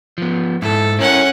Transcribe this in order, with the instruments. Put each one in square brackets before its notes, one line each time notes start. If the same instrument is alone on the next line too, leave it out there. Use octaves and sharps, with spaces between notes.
[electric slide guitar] F3 B3
[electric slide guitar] G#2 E4 [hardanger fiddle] A4
[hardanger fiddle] C#4 F#5 [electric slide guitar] E4 A#4